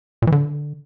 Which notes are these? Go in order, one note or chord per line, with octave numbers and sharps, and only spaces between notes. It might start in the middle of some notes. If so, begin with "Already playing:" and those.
A#2
E3
D3